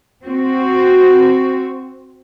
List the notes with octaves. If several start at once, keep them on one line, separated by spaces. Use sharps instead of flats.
C4 F#4